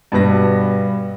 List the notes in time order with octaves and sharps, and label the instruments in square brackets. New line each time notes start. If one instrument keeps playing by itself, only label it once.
[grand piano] G2 B2 B4 A#6